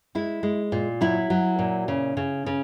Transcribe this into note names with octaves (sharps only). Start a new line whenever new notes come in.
G#3 E4
G#3
A#2
F#3 E4
F#3
A#2
C#3
C#3
C#3